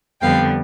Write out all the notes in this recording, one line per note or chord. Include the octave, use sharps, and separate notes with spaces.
F2 D3 G3 B3 F5 G5